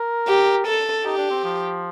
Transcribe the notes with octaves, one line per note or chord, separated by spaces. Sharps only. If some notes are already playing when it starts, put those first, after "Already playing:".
Already playing: A#4
G4
A4
D#4 G4
D4
C4
F3